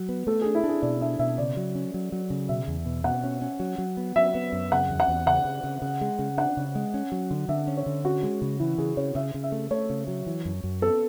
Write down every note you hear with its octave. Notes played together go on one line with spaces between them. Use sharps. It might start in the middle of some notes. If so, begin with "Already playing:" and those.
Already playing: F#3
B3
A3 A4
D4 G#4
E4
D4 G#4
B2 D5
D4 E5
B2 E5
C#3 D5
F#3
C#4
F#3
F#3
C#3
B2 E5
E2
B2
B2 F#5
C#4
C#4
F#3
F#3
B3
F#3 E5
B3
F#2
C#3 F#5
E2
F#5
E2
C#3 F#5
C#3
C#3
C#3
G#3
C#3
D4 F#5
C#3
G#3
C#4
F#3
D3
D3 E5
C#4
C#5
D3
C#4 F#4
G#3
C#3
E3 E4
C#3 G#4
C#3 C#5
C#3 E5
C#3
E5
A3
A3 C#5
C#3
F#3
E3
F#2
F#2
B3 A4